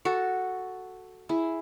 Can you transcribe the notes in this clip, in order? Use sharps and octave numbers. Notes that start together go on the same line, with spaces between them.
F#4 A4
E4 G#4